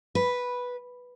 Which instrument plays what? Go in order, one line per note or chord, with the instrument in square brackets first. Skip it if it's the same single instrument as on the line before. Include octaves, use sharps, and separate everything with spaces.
[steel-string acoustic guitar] B4